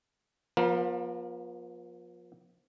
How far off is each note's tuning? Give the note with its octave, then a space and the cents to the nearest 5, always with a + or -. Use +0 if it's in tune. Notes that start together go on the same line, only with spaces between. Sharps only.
F3 +25 B3 -45 A#4 +5